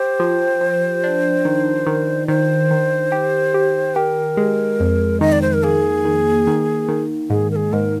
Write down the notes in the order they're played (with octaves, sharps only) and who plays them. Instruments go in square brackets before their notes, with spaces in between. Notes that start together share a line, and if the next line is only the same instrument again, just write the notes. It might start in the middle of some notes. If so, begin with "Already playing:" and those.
Already playing: [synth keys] G4 [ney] C5
[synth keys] F3
F3
D4
D#3
D#3
[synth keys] D#3 [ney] C5
[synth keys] D#3
G4
G4
[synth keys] G4 [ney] A#4
[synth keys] G#3
F2
[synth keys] D#3 [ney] D#5
[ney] D5
C5
A#4
[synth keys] A#3 [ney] G#4
[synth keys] D#3
D#3
D#3
[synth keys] G#2 [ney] G#4
[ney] A#4
G#4
[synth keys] G#2 [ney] A#4